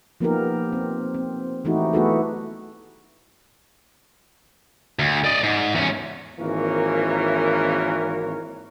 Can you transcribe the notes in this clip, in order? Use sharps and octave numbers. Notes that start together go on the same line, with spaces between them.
F3 A#3 B3 D#4 G4 A#4
C4
C4
E3 A3 D#4 E4 F#4 G4
A3 B3 E4 F#4 G#4 A4
D2
D5 D#5
G#2
E2 C#4
G#1 E3 A#3 A#4 C#5